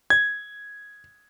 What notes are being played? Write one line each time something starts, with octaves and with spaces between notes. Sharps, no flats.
G#6